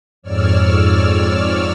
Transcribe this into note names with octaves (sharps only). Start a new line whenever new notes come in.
F2 G#2 C#5 D5 E6 F6